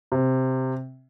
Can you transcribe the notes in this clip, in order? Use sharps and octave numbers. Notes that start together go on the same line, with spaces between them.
C3